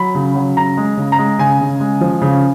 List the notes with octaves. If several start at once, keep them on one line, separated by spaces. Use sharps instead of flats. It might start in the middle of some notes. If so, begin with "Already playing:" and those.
Already playing: F#3 B5
C#3
F#3
C#3 A#5
G#3
C#3
A#5
G#3
C#3 G#5
C#3
G#3
F3
C#3